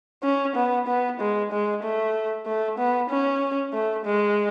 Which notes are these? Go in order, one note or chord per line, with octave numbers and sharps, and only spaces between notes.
C#4
B3
B3
G#3
G#3
A3
A3
B3
C#4
A3
G#3